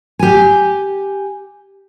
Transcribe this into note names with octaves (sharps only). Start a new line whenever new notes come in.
G4 G#5